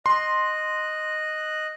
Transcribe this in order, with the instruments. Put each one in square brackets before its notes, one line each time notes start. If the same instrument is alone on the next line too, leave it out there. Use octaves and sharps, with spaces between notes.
[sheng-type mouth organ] D#5 F#6 [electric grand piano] C6